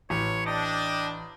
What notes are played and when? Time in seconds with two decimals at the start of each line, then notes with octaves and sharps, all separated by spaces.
0.10 A1 C#5
0.46 D4 D#5 G5 A5 D6